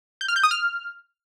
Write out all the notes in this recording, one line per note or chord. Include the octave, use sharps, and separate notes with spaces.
G6
F6
G6
D#6
F6